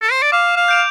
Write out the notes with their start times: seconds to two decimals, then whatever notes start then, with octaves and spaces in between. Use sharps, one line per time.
0.02 A4
0.11 C5
0.22 D5
0.32 F5 D6
0.56 F5
0.68 G6 D7 F7